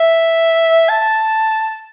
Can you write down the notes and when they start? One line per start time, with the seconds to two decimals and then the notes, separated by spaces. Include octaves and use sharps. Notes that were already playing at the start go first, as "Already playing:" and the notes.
Already playing: E5
0.90 A5